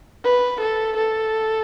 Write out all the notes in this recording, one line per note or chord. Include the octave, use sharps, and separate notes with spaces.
B4
A4
A4